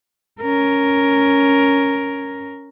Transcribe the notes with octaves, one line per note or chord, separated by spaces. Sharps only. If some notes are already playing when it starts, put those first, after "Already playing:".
C#4 A#4